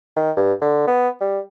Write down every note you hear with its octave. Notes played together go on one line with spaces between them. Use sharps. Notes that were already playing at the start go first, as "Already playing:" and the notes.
D#3
G2
D3
B3
G3